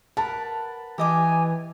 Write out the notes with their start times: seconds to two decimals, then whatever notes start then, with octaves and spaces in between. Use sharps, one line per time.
0.17 A#4 B4 F#5 A5
0.98 E3 G4 D#5 G#5 D6